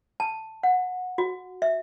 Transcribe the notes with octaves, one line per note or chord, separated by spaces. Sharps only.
A5
F#5
F#4
E5